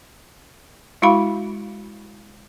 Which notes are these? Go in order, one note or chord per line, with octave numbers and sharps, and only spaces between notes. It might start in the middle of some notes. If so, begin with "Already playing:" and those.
G#3 E4 F#4 F5 B5